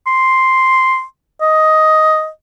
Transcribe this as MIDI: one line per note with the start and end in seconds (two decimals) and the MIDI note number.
0.07 1.03 84
1.42 2.29 75